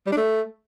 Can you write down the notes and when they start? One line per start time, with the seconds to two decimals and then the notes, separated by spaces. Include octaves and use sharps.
0.07 G3
0.12 D4
0.17 A3